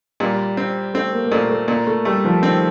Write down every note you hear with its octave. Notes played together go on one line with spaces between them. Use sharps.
A#2 G3
C4
A3 C4
A#3
A#3
A#2 A3
A3
A#2 A#3
A3
G3 A3
F3
D#3 C4